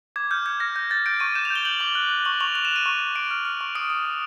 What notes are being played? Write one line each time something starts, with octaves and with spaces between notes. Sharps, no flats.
D6 G#6
F6 G6
F6 G#6
F6 A#6
G6 G#6
G6 A6
G6 D7
C#6 D#7
G6 E7
F7
G6
G7
G6 F#7
D6 G7
F#6
F#6
C#6 F#7
C#6 F7
F#6 F7
E7
F#6 D#7
C#6
C#6
C#6 D7
F6
F6
C#6
D#6 D7
D#6
D#6